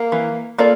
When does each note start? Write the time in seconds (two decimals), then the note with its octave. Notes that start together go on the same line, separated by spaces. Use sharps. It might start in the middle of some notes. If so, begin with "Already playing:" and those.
Already playing: A#3
0.12 E3
0.58 A#3 F4 A4 D5